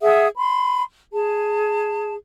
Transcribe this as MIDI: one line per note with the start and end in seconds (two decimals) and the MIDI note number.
0.02 0.27 68
0.02 0.27 76
0.02 0.27 78
0.02 0.27 87
0.36 0.84 83
0.36 0.84 84
1.13 2.15 68
1.13 2.15 81